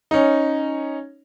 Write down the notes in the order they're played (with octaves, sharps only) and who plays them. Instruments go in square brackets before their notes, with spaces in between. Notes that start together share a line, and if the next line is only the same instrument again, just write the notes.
[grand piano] C#4 D#4